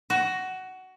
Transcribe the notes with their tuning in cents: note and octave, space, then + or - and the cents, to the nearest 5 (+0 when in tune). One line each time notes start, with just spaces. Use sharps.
F#4 +15